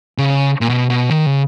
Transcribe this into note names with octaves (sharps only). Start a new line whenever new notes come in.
C#3
A#2
B2
B2
D#3
C#3